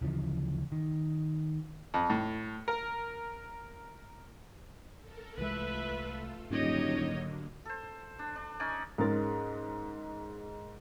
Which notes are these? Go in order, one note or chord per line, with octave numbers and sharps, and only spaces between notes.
D2 C#3 E3 F3
D#3
F2
A2
A#4
A4 A#4
C2 E3 G#3 A3 F4 A4 B4 E5
D#1 G#2 D3 F#3 A#3 G4 C#5 D#5
A4 C5
D4
D4
C#4 D#4 D5 G#5
G#2 G#3 C#4 A#4 A6